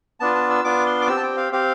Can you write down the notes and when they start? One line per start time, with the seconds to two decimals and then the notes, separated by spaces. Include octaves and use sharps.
0.20 B3 D4 F4 A5
0.35 A5
0.50 E6
0.64 B3 D4 F4 D6
0.86 C6
1.01 D6
1.08 C4 G4 E6
1.17 A5
1.23 G5
1.37 F5
1.52 C4 G4 F5